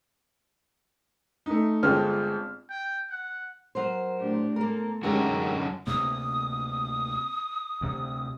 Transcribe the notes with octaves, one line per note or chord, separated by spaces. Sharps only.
A3 D#4
G1 G#3 C4 F4 A4 F6
G5
F#5
F#3 A#4 C5
A2 D4 G4
A#3 C4 A4 A#4
F#2 D3 G#3 C#4 D#4 F#4 G4 A#4
D2 C3 A#3 D#6
D2 C3